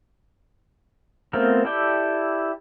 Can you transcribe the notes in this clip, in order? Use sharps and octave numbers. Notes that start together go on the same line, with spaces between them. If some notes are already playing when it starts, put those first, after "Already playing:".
A3 B3 C4 F4 A#4
E4 G4 A4 D5 G5